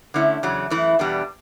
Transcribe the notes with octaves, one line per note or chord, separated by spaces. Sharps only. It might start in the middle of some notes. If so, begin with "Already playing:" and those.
D3 A3 C#4 E4
E2 C#3 F#3
F#2 E3 A3 E4
E2 B2 G3 B3 D4